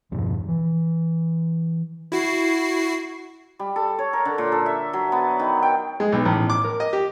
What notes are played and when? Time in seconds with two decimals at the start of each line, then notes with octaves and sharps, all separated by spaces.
0.11 E2 G2 B2 F3
0.48 E3
2.12 E4 F#4 C7
3.59 G3
3.76 A4
3.99 C#5
4.13 A#4
4.25 D3
4.38 A#2
4.52 A4
4.66 E5
4.93 F#3
5.12 B3
5.39 D#3
5.63 G5
6.00 G#3
6.12 B1
6.25 A1
6.50 D6
6.64 A#4
6.80 D#5
6.93 G4